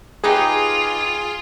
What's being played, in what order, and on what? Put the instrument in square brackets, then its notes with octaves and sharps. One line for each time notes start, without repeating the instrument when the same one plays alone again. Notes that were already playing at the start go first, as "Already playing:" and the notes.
[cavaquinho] D#4 G4 B4 [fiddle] F4 [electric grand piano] G#4